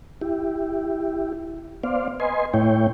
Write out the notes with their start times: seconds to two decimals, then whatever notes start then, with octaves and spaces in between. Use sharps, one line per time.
0.21 E4 G4
1.83 B3 C5 D5 F5
2.20 B4 D#5 G#5 C6
2.54 A2 A3 E4 C#5 G5